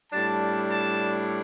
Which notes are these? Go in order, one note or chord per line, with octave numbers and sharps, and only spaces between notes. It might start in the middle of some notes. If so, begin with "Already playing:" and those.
A2 G3 D4 A5
A5